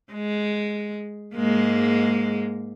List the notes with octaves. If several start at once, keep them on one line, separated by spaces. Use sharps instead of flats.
G#3
G#2 G#3 A#3